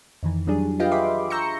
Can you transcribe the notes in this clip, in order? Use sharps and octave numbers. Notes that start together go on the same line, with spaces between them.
F2 D#3 E3
F#3 G3 D4 G#4
F4 G4 B4 D#5 F5 G5
G#4 E5 B5 C6 D6
A#5 C#6 E6 G6 A#6 C#7